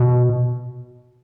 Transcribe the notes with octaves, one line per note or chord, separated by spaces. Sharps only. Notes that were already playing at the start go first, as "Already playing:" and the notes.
Already playing: B2